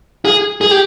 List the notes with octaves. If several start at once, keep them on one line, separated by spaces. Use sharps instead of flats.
G#4
G#4
G4